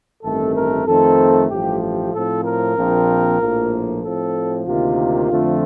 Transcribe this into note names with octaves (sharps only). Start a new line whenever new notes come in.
A1 G2 D#3 A3 C4 A4
A#4
F2 D#3 A3 C4 A4
A1 G2 F3 A3 G4
G4
A2 F3 C4 A4
A#4
A#1 A#2 F3 C4
A#1 A2 F3 A#3
A2 F3 C4 A4
D2 C3 D#3 A#3 F4
F2 D3 F3 A3 C4